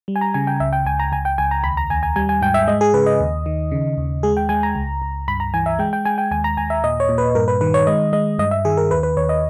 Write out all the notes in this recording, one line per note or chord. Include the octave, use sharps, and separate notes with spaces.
G3
G#5
A#5
C#3 G#5
G5
C#2 E5
G5
C#2 G#5
A#5
C#2 G#5
G5
C#2 G#5
A#5
D#2 B5
A#5
D#2 G#5
G#5
G3 G#5
G#5
G#2 G5
E5
G#3 D#5
G#4
C#3 B4
D#5
D#2
D#3
C#3
D#2
G#3 G#4
G5
G#3 G#5
A#5
C#2
C#2
G2 B5
A#5
E3 G#5
E5
G#3 G5
G5
G#3 G#5
G5
D#2 G#5
A#5
D#2 G#5
E5
A#2 D#5
C#5
A#2
B4
G2 A#4
B4
D#3 B4
C#5
G#3 D#5
G#3 D#5
G2 D#5
E5
D#3 G#4
A#4
D#2 B4
B4
D#2 C#5
D#5